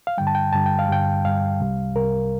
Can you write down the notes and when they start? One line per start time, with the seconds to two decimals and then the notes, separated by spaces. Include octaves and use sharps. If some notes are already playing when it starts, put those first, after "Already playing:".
0.07 F5
0.18 G2 D3 G3 G5
0.27 A5
0.35 G5
0.53 G2 D3 G3 A5
0.66 G5
0.79 F5
0.88 G2 D3 G3 G5
1.24 G2 D3 G3 F5
1.60 C2 C3 G3
1.95 C2 C3 G3 A#4